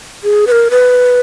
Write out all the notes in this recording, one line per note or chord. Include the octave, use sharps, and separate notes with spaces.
G#4
B4
A#4
B4